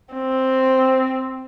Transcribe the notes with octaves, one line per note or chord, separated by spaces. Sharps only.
C4